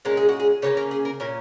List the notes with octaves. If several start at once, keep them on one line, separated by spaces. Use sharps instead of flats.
A#2 G#3 C#4 A#4
G#4
F#4
G#4
C#3 A#3 C#4 C#5
A#4
G#4
A#4
A#2 A#3 C#4 A#4